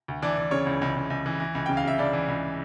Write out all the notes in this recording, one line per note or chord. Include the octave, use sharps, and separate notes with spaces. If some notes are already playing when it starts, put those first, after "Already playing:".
D2
E3 D4 D5
E3
C#3 C#5
C#2
C#2
C#2
C#2
E3
E3
C#2
C#3 G5
F5
C#3 E5
C#2 D4 D5
E3
C#2